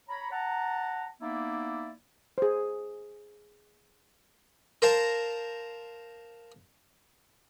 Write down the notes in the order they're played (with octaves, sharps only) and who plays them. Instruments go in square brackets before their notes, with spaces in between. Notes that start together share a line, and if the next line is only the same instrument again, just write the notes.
[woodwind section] C#5 A#5 B5
F#5 A5 A#5
A#3 B3 D#4 E4 D5 E5
[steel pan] G#4 C5
[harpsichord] A#4 C5 F5 A5 A#5